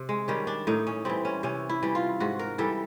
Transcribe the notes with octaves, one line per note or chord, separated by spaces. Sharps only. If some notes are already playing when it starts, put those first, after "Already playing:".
Already playing: C3
G#3
D#3 G3 C#4
D4
A2 D#4
C#4
E3 G3 C4
C#4
C3 C#4
E4
E3 G3
F4
G#2 F#4
A#4
E3 G3 A4